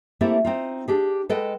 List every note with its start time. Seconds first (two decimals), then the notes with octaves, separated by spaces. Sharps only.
0.21 A3 A#3 C4 E4 G4 A4
0.45 C4 D#4 F4
0.88 D4 G4 G#4
1.29 G#3 A4 B4 D#5 F#5 G5